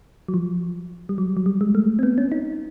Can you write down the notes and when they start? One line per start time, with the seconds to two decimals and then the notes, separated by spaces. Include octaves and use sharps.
0.28 F#3
0.34 F3
1.09 G3
1.18 F#3
1.37 F#3
1.46 G3
1.61 G#3
1.75 A3
1.99 C4
2.03 B3
2.18 C#4
2.32 D#4